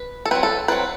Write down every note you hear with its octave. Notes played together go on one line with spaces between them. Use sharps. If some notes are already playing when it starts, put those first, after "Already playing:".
Already playing: B4
A4
F#3 C4 B4
A4
F#3 C4 B4